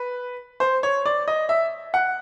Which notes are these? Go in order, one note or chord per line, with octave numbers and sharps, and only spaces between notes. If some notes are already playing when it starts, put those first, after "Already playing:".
Already playing: B4
C5
C#5
D5
D#5
E5
F#5